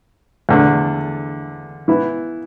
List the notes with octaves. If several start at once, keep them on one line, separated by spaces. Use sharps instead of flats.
E2 D3 A3 D4
E3 B3 E4